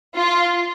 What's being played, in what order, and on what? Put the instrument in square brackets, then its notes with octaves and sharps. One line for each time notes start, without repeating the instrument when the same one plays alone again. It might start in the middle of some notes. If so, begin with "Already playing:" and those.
[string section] F4